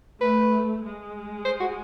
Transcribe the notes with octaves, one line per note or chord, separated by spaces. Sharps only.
A3 B4
G#3
C5
F#4